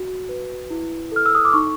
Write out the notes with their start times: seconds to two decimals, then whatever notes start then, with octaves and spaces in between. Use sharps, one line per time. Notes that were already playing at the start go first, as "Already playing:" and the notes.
Already playing: F#4
0.29 B4
0.71 E4
1.12 A4 F6
1.26 E6
1.35 D#6
1.45 D6
1.53 D#4 C#6